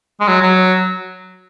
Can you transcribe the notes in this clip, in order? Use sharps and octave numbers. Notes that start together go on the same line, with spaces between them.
G#3
F#3
F#3